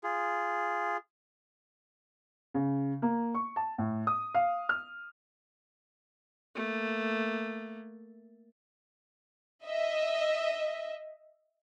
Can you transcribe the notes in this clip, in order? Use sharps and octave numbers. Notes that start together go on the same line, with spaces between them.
F4 G#4
C#3
A#3
C#6
A5
A2
D#6
F5
F6
A3 A#3
D#5 E5